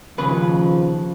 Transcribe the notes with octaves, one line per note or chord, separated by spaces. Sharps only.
D#2 C#3 F3 B4